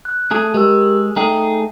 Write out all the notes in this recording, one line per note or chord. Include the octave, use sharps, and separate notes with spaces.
F#6
A3 G#4
G#3 G4 A#4 E6
A3 D#4 G#4 G5